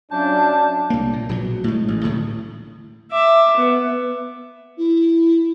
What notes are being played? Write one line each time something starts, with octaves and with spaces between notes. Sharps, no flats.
F#3 C#4 D4 F4 E5 A5 G6
C2 A#3
A#2
A#1 B2 D#3 F#3
A2 G#3
A1
D#1 A2 D3
E5 D6
B3
E4